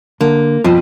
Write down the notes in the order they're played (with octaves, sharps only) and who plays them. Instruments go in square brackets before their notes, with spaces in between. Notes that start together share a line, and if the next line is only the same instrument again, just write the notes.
[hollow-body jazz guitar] D3 [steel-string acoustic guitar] A#3
[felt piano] F2 [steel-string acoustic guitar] B2 F3